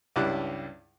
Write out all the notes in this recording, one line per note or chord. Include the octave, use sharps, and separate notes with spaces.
C#2 G2 D4 E4 D6 F#6